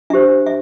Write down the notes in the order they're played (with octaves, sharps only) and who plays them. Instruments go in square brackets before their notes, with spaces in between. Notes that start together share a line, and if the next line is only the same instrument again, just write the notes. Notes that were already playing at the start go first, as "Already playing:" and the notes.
[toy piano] D4 G4 C5 E5
E5